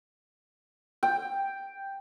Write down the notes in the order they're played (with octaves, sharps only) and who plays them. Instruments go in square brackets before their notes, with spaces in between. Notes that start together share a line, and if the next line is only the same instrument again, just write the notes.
[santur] G5